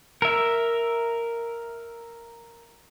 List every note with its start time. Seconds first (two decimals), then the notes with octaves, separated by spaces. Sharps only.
0.22 A#4 E5